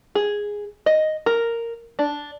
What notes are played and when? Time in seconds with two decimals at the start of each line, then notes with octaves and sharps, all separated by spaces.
0.15 G#4
0.86 D#5
1.26 A#4
1.99 D4